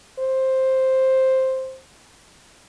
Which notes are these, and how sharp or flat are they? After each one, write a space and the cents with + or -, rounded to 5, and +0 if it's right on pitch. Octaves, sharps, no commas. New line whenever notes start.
C5 +5